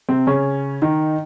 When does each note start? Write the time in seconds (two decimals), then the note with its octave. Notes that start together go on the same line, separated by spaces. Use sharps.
0.09 C3 C4
0.27 C#3 C#4
0.82 D#3 D#4